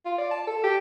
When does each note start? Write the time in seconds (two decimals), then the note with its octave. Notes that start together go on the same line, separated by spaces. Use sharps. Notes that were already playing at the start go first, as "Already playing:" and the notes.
0.05 F4
0.18 D5
0.31 A5
0.47 A4
0.64 G4